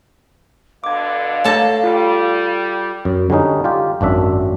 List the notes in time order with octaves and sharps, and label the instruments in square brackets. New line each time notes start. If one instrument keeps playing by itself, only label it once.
[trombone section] B2 D3 [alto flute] F5 [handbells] D6 G#6
[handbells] A3 C#5 [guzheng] A4 A5 A#5
[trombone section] G3 [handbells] F4
[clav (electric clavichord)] F#2
D3 G3 C#4 D#4
F4 G4
G#1 F#2 D4 E5